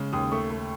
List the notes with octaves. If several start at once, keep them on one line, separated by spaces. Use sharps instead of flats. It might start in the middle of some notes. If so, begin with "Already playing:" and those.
Already playing: C#3 G#3
D#2 D#6
A3 C#6
A3